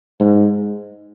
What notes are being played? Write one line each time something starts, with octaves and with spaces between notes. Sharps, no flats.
G#2